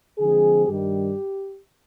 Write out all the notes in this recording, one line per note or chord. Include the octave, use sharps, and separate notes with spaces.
D3 F3 G#3 C4 G#4
G2 D#3 G3 G4